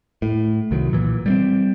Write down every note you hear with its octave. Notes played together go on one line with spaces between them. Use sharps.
A2
C2 D#3 F#3
A#2 E3
G3 A3 C4